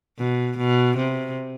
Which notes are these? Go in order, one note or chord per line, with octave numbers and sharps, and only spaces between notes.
B2
B2
C3